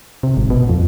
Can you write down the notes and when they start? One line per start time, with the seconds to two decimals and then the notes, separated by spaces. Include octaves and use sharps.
0.23 C3
0.37 G#1
0.50 B2
0.69 F2